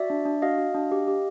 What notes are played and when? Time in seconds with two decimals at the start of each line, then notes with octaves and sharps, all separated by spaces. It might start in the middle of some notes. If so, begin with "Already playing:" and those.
Already playing: F#4 D5 E5
0.10 D4
0.25 D4
0.42 F#4 D#5 F5
0.58 F#4
0.74 D4
0.92 G4
1.08 G4